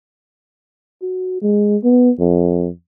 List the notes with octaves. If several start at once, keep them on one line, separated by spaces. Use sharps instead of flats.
F#4
G#3
B3
F2